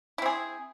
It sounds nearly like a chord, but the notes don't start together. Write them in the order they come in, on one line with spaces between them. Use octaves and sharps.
E4 C4 G#4